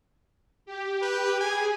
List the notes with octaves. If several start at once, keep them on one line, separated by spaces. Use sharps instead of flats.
G4
B4
G#4 G#5